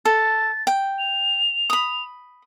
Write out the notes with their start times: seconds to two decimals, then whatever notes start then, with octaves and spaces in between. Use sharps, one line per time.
0.05 A4 A6
0.67 G5
0.99 F7
1.70 B5 D#6